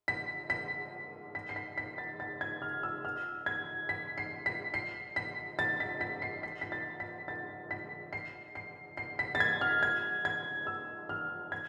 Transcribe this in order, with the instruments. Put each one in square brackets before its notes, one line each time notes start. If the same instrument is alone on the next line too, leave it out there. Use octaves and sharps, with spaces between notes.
[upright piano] B6
B6
B6
C7
B6
B6
A6
A6
G#6
F6
E6
F6
G#6
B6
C7
B6
C7
B6
A6
B6
B6
C7
B6
B6
A6
B6
A6
B6
C7
C7
C7
B6
A6
G#6
F6
G#6
G#6
E6
F6
G#6